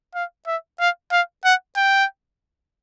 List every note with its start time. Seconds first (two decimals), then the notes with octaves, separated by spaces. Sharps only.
0.14 F5
0.46 E5
0.79 F5
1.11 F5
1.44 F#5
1.76 G5